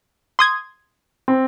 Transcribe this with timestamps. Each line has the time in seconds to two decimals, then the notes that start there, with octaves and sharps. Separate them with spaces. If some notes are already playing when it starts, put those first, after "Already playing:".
0.39 C6 D#6 G#6
1.28 C4